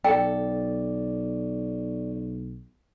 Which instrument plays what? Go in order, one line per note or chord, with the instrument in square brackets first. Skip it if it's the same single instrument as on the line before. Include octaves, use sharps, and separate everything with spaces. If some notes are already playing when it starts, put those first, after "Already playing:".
[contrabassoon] B1 [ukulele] A4 [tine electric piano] D5 [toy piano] G5